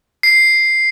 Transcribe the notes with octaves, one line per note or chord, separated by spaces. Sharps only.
C7